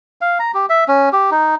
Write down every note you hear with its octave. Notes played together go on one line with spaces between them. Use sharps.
F5
A#5
G4
E5
C#4
G4
D#4